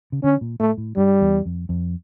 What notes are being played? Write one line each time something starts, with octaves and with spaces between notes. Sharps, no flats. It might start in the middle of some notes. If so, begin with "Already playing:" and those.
C#3
D3 C#4
A#2
A2 A3
A2
G2 G3
E2
F2
F2